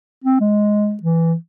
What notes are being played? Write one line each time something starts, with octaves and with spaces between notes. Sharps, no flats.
C4
G#3
E3